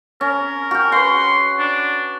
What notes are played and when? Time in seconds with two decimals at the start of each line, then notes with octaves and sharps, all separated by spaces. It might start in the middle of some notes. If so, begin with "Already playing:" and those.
0.21 C#4 A#4
0.71 F#4 G5
0.92 B4 F#5 C6
1.59 D4